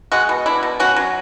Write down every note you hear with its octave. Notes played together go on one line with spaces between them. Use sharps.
G#3 F#4
B2
D4 E4
B2
C#4 F#4
F#3